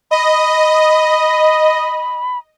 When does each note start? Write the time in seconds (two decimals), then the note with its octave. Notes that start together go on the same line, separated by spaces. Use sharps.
0.11 D#5 B5